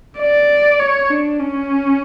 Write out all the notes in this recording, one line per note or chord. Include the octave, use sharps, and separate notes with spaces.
D5
C#5
D4
C#4